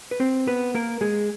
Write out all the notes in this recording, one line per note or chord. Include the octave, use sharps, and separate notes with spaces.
B4
C4 C5
B3 B4
A#3 A#4
G#3 G#4